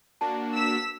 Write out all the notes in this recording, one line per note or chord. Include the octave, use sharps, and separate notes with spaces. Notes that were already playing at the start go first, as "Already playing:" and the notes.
A#3 D4 F#4 A5
E6 B6